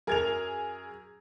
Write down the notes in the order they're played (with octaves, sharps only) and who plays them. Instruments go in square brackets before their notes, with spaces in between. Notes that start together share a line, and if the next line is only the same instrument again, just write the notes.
[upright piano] F#2 A#4 [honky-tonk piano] G#4 G#6 F7